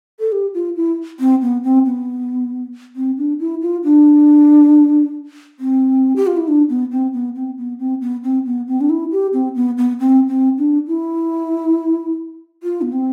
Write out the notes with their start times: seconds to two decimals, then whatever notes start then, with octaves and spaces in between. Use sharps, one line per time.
0.20 A4
0.32 G4
0.54 F4
0.77 E4
1.20 C4
1.42 B3
1.64 C4
1.86 B3
2.96 C4
3.18 D4
3.40 E4
3.62 F4
3.84 D4
5.60 C4
6.16 G4
6.27 F4
6.37 E4
6.48 D4
6.70 B3
6.92 C4
7.14 B3
7.36 C4
7.58 B3
7.79 C4
8.01 B3
8.23 C4
8.46 B3
8.68 C4
8.81 D4
8.90 E4
9.12 G4
9.33 C4
9.55 B3
9.78 B3
10.00 C4
10.29 C4
10.58 D4
10.87 E4
12.63 F4
12.82 B3
12.92 C4